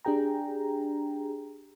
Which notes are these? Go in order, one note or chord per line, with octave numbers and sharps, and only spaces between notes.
D4 G4 G#4 G5 A#5